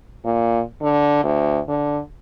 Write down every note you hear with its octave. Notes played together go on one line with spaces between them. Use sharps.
A#2
D3
D2
D3